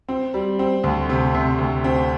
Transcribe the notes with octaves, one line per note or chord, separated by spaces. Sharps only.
C4
G3
C4
D2
C3
C3
D2
C4